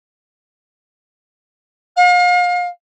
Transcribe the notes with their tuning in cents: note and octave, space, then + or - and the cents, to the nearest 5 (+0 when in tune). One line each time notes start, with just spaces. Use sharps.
F5 +35